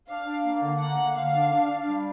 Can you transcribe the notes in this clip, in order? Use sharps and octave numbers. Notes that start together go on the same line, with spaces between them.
D4 F5
D4
A#3
D3
A#3 F#5
D3
D3 F5
D4
D4
D4
G3